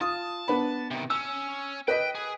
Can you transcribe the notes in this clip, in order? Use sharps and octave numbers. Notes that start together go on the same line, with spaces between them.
F4 A5 D#6
B3 D4 B5
C3 D#3
C#4 E6
B4 D#5 G5 B6
G#4